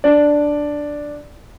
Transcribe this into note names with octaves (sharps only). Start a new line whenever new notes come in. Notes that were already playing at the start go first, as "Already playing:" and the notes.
D4 D5